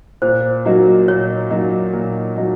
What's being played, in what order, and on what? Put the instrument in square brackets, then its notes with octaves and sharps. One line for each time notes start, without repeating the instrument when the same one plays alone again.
[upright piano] A#2 [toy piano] C5
[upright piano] F#3 A#3 D#4 F#4
[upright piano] A#2 [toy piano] C#5
[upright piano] F#3 A#3 D#4 F#4
A#2
F#3 A#3 D#4 F#4